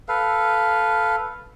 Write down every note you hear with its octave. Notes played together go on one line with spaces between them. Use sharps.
A4 B4 F5